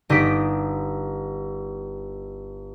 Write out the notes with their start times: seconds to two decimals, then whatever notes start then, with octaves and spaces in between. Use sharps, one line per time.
0.09 G1 D#4 G4 D#6 B6 D7